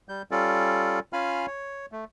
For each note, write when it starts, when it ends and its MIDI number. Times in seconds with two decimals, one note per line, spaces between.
0.09 0.22 55
0.09 0.22 91
0.31 0.99 55
0.31 0.99 61
0.31 0.99 65
0.31 0.99 69
0.31 0.99 74
1.13 1.46 61
1.13 1.46 65
1.13 1.46 77
1.13 1.46 80
1.13 1.46 83
1.13 1.46 89
1.47 1.86 73
1.92 2.05 57